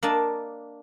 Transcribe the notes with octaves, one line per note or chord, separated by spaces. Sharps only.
A#3 D4 D#5 A5